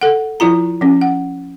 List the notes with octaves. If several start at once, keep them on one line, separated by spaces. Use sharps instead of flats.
A4 F#5
F3 E4 F4 A#5
F3 C#4
F#5